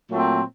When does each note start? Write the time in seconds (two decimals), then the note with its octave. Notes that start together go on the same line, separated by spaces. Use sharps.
0.11 A#2 F#3 A3 C4